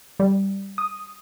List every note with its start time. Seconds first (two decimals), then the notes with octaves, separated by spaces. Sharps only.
0.20 G3
0.78 D#6